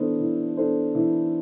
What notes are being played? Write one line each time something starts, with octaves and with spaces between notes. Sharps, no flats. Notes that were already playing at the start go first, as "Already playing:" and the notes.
Already playing: E3 B3 D4 A4 C5
E3
B3 D4 A4 C5
E3